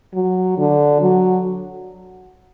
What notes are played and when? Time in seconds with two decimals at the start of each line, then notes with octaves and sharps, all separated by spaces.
0.14 F#3
0.58 D3
1.01 F#3